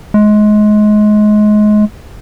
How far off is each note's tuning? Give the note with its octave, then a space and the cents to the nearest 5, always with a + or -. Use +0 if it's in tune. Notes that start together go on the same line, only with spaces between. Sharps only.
G#3 +25